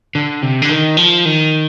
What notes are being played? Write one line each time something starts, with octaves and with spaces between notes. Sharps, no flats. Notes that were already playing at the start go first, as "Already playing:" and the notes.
D3
C3
D3
D#3
F3
D#3